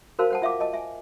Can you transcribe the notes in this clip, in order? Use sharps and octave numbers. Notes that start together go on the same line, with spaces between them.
F#4 A#4 C5 F5 A5
C5 F#5 A5
F4 E5 F5 D6
D#5 A5
E5 G#5